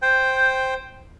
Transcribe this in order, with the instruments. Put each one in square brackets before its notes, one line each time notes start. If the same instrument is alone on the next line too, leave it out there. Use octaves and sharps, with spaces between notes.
[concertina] C5 G5